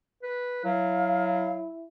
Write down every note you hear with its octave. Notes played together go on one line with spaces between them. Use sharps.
B4
F#3 E4 F5